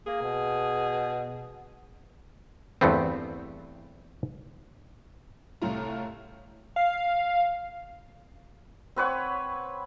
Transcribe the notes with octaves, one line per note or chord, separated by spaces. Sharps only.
A#3 G#4
B2
E2 G2 A3 B3 C4
C2 A2 A3 F4 A#5
F5
C4 B4 C#5 F#5